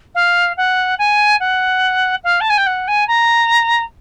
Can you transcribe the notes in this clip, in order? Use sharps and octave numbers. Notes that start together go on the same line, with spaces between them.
F5
F#5
G#5
F#5
F5
A5
G#5
G5
F#5
G#5
A#5